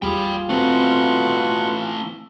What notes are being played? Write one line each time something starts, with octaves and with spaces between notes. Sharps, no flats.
G#1 E2 G3 F4 G#4 G5 B5
B2 E3 A3 C4 C#6 F#6